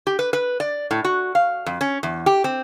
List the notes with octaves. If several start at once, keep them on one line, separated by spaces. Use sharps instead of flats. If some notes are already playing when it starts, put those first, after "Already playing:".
G4
B4
B4
D5
A2
F#4
F5
F2
C#4
E2
G4
C4